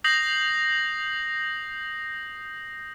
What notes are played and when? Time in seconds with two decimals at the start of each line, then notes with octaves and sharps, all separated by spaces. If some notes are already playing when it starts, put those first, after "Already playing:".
0.04 D#6 G6 A#6 C7 F#7